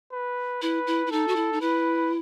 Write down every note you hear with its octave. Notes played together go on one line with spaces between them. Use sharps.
B4
E4 B4
E4
E4
D#4 A4
F#4
E4
D#4
E4 B4